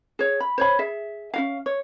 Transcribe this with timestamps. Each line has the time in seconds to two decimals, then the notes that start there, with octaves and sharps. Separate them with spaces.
0.19 G#4 C#5
0.40 B5
0.58 C5 C#5 B5
0.79 G#4 E5
1.34 C#4 F#4 F5
1.66 C#5